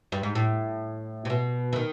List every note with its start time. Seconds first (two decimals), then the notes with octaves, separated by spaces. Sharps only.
0.12 G2
0.23 G#2
0.35 A2
1.25 C3
1.30 B2
1.73 E3
1.76 D#3